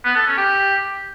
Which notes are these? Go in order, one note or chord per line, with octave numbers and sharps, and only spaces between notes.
B3
A4
C#4
G4